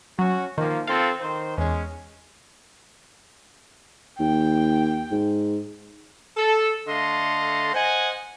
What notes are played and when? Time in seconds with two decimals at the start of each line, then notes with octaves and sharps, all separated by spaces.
0.19 F#3 C#4 F#4
0.58 D#3 F3 A#3
0.87 C4 F4 A4 F5 C6
1.20 D#3 C5
1.58 E2 G#3 C#4
4.19 D#2 G5
5.11 G#2
6.37 A4
6.87 D3 A3 A4 D#5 F5 C6
7.74 C5 D#5 F#5 G#5